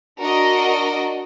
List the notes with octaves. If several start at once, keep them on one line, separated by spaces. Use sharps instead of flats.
D4 F#4 A#4 D#5